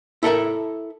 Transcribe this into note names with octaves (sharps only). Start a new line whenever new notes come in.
E4 A4 A#4 E5